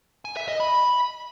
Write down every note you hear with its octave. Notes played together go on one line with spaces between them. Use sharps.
G#5
E5
D#5
B5